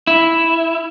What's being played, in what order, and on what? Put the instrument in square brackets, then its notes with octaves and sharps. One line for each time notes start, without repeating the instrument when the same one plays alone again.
[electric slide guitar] E4